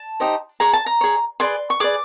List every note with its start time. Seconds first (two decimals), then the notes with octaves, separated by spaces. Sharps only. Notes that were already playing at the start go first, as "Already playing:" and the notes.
Already playing: A5
0.20 D#4 G4 C5 D#5
0.60 G#4 C#5 A#5
0.73 A5
0.86 A#5
1.01 G#4 C#5
1.40 G#4 B4 D5 C6
1.70 C#6
1.80 G#4 B4 D5 D6